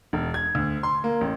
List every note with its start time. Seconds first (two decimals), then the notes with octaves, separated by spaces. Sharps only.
0.13 E1
0.34 G#6
0.55 D2
0.83 C6
1.04 A#3
1.21 A1